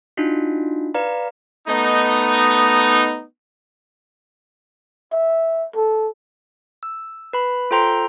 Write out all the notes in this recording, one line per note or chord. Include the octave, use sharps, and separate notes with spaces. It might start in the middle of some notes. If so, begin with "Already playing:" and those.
D4 D#4 F4 F#4
B4 D5 F5 A#5
A3 B3 D#4
E5
A4
E6
B4 B5
F4 A4 C5 G5 A#5 C6